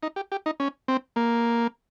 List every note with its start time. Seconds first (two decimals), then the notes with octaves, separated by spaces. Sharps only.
0.03 D#4
0.16 G4
0.32 G4
0.46 D#4
0.60 C#4
0.88 C4
1.16 A#3